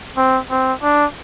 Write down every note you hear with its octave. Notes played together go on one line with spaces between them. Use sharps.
C4
C4
D4